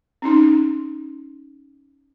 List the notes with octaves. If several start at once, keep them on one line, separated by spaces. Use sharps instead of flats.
C4 C#4 D#4